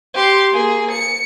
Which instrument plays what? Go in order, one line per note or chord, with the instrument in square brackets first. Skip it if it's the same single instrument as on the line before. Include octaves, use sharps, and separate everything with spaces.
[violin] G4 C6
A#3 G#4
C#7